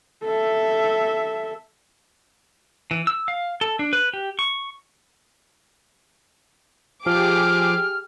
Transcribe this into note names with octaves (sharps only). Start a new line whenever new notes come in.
A4 E5
E3
E6
F5
A4
D4
B4
G4
C#6
F3 G4 G#4 D6 F6